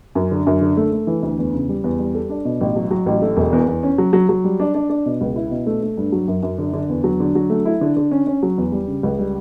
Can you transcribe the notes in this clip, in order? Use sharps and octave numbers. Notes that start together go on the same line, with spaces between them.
F#2
D3
F#2
D3
A3
A3
E3
D2
E2
C#3
G3
E2
G3
A4
D4
B2
A1
F#3
F#3
A1
A3
E1
E2
E2
C#4
F#3
F#3
F#3
G3
D4
D4
D4
B2
C#2
E4
B2
A3
A3
G2
F#3
F#2
F#2
D3
D3
E2
F#3
D3
F#3
A3
E4
D3
D3
C#4
C#4
F#3
E2
G3
C#3
C#2
G3